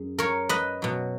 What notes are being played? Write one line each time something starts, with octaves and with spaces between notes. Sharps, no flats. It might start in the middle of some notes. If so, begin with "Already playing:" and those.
Already playing: F#2 G#4
A#4 C#5
B4 D#5
B2 F#3